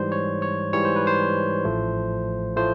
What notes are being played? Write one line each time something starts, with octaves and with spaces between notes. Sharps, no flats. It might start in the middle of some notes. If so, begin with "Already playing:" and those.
Already playing: G#2 E3 G3 C5
C#5
C#5
G#2 E3 G3 C#5
C5
B4
C5
A1 A2 F3 A3
A2 F3 A3 C5